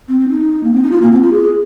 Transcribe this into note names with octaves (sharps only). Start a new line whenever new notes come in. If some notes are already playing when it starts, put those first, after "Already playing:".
C4
C4
D#4
A#3
C4
D#4
F4
A#3
C4
F4
G#4